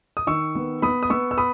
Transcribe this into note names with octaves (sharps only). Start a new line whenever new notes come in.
D#6
D#3 C#6 E6
B3
B3 B5 D#6
D#6
B3 C#6 E6
E6
B5 D#6